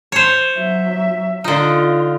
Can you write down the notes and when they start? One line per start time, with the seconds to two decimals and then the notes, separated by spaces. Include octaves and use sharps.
0.12 C5 C#5
0.57 F#3 E5
1.44 D3 D#4 F4